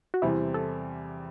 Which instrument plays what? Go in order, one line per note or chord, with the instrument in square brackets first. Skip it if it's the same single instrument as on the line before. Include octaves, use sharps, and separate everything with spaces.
[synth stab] F#4
[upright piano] E2 C3 G3 C4 [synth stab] E4
[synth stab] A4